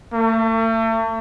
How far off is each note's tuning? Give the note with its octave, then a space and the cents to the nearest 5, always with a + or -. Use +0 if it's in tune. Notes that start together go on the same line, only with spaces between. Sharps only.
A3 +35